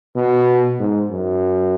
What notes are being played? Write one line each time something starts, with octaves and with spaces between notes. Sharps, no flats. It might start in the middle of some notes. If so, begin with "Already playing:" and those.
B2
G#2
F#2